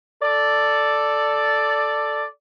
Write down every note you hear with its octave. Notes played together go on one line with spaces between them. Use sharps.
A4 D5